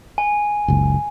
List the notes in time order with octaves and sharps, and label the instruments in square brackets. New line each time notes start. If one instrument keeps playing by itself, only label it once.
[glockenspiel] G#5
[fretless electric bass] F#1 C#2